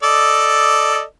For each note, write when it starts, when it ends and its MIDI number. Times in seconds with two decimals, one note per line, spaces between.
0.03 1.03 69
0.03 1.03 74
0.03 1.03 75